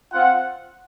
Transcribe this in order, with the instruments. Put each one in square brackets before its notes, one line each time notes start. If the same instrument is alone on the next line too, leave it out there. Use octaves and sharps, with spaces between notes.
[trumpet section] C4 F4 F#5